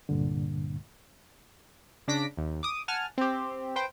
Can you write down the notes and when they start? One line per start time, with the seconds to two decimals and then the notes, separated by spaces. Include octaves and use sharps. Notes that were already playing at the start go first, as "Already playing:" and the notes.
0.09 C2 G2 A#2 D3
2.08 C#3 D4 A#6 B6 D7
2.37 D#2
2.63 D6 D#6
2.88 F#5 G#5 A5 F6
3.18 C4 G4
3.76 B4 C5 G5